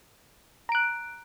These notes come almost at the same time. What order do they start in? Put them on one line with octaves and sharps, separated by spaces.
A#5 D7 F#6